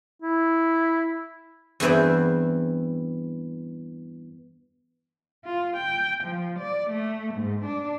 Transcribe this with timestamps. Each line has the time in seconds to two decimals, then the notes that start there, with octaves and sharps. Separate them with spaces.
0.22 E4
1.80 E2 G2 E3 C4 C5
5.46 F4
5.77 G5
6.24 F3
6.60 D5
6.91 A3
7.35 G#2
7.65 D4